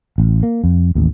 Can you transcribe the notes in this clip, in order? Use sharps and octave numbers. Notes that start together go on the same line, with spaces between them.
A1
A#3
F2
A1 D#2